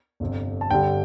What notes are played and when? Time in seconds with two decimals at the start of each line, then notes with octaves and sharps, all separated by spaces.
0.20 G1 F2 C3
0.61 A5
0.70 G1 G2 D3 G3 G5